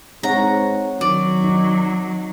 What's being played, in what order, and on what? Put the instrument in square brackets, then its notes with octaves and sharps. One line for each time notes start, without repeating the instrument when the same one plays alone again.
[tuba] G#2 [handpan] C4 C#5 F#5 [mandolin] A#5
[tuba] D#3 [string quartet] F#3 [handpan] F#4 [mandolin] D5
[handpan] D#4